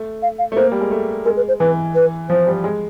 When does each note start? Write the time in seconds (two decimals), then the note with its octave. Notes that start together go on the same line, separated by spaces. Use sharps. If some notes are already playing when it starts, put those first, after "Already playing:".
Already playing: A3
0.22 F5
0.39 F5
0.52 A3
0.56 A#3 C5
0.72 G3
0.81 G#3
0.91 A3
1.25 G#3 A#4
1.37 B4
1.48 C5
1.60 E3 B4
1.95 B4
2.30 F3 C5
2.47 G3
2.64 G#3